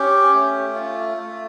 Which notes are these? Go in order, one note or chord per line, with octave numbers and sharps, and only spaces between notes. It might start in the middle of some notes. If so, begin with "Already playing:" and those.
Already playing: C#4 G4
A3
F4
A3